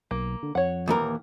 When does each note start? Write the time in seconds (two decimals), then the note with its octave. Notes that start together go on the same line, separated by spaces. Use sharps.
0.11 B1 A#3
0.43 D3
0.55 F2 C#5 F#5
0.88 D#2 E3 A#4
1.01 A#2